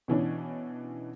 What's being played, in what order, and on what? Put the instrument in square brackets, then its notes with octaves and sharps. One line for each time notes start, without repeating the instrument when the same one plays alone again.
[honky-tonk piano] B2 E3 C#4 D4